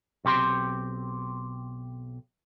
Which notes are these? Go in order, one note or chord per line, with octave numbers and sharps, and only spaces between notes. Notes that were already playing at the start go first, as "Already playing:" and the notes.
B1 C4 G4 C6